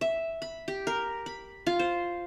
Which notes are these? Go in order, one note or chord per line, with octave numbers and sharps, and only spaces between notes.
E5
B5
G4
A#4
B5
F4
C5